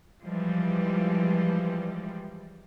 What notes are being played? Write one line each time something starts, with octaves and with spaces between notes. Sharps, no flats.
E3 F3 G3 G#3